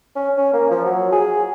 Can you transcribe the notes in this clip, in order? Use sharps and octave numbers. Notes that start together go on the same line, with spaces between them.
C#4
C#4
A#3
F3
F#3
G#4